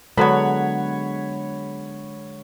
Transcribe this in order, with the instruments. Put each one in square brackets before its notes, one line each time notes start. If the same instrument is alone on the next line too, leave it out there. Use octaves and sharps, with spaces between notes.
[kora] D3 F#3 B3 [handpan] G#3 F#5 [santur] C#5 B5